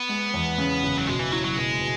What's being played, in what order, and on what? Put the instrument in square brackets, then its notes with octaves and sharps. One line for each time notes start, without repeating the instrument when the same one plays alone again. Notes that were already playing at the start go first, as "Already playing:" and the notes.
Already playing: [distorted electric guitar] B3
[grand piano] G#3
E2
C#3
F#1
[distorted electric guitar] F#3
[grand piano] B2 [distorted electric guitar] G#3
[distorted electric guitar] E3
[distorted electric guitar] F#3 [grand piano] E4
[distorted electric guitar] F#3
[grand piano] B2 [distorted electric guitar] G#3
[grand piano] B2